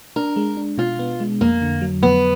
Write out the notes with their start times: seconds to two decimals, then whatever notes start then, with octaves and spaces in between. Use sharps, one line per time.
0.16 D4 A#4
0.36 G#3
0.57 D4
0.78 B2 F4
0.99 B3
1.20 G#3
1.41 F2 A#3
1.62 D3
1.81 F#3
2.03 F2 B3